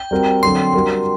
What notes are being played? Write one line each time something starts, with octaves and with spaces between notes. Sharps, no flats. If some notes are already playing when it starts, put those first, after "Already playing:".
Already playing: G5
G3 C4 F#4 A#4
D3 F#3 C4 C6
G3 D4 F#4 A#4